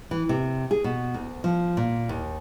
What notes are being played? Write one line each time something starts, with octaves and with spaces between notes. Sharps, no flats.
E3
C3
G#4
B2
D2
F3
A#2
D#2